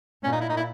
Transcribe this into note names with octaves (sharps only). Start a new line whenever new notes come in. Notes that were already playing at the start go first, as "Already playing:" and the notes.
A#2 C#4
D#4
E4
D#4
E4